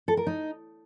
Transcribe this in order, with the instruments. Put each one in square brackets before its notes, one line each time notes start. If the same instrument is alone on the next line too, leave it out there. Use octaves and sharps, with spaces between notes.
[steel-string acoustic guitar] A4
A#4
D#4